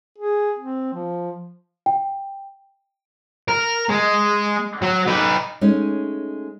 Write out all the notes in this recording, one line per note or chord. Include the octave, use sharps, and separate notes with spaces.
G#4
C4
F3
G5
A#4
G#3
F#3
D#4 B4
G#3 A3 C#4 D#4